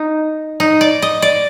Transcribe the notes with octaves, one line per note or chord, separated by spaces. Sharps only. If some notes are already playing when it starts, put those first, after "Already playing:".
Already playing: D#4
D#4
D5
D#5
D5